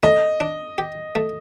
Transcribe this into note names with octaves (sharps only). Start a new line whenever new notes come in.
A3 D#5
D4
G4
A3